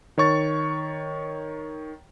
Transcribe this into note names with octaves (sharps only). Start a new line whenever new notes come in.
D#3 C#5 C#6 A6